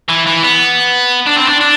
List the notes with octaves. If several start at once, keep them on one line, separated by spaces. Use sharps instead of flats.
E3
E3
B3
D4
C4
D4
D4